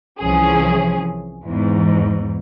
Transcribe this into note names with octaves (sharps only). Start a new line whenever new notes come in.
C2 E3 F3 C#4 G#4
E2 G#2